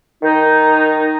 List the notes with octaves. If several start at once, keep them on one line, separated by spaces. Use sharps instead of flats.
D#3 D#4